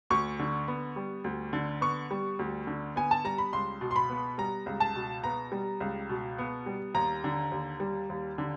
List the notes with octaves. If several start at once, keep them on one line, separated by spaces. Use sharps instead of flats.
D2 C#6
D3
B3
G3
D2
D3
B3 C#6
G3
D2
D3
B3 G#5
A5
G3 A#5
B5
C#2 C6
B2
C6
B5
B3
G3 A#5
C#2
A5
B2
B3 A#5
G3
C#2
B2
B3
G3
D#2 A#5
D3
D#2
G3
D#2
D3